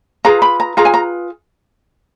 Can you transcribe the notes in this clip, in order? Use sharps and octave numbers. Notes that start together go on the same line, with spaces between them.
F4 G#4 B4 A#5
B5
A#5
F4 G#4 B4 A#5
G#5
A#5